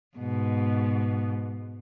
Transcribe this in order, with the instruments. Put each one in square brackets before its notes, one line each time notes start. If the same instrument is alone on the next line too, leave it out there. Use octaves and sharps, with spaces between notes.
[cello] G#2 B2